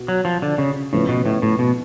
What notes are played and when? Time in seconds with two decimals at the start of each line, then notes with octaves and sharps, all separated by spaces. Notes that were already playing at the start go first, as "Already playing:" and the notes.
Already playing: B2 F#4
0.08 F#3
0.25 F3
0.42 D3
0.58 C#3
0.93 A2 C#3 F3 B3
1.09 B2
1.26 A2
1.42 A2
1.59 B2